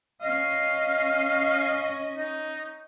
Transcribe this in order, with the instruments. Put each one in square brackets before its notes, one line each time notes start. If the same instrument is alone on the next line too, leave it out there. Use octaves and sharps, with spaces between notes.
[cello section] C#4 D#5 [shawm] F5
[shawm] D#4